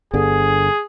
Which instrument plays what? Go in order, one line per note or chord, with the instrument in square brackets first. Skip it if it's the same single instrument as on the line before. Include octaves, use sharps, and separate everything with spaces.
[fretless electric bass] G1 G2 D3 [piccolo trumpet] G#4